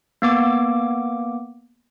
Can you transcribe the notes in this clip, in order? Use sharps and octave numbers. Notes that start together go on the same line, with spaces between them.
A#3 B3 D6